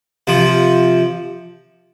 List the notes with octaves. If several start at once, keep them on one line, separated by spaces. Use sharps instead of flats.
C3 F3